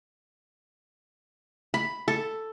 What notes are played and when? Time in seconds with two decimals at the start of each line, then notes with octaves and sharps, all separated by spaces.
1.74 B5
2.08 A4